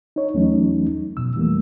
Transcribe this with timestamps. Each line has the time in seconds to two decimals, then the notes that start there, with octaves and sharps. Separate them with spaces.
0.16 D#4 C#5
0.34 E2 E3 F#3 A3 C#4 D#4
1.17 F2 B2 E6
1.35 F2 E3 G3 A3 A#3